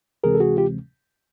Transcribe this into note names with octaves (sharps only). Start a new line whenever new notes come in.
D2 C3 E3 G#3 C4 G#4 A#4
A4
F#4 G#4
F4 G4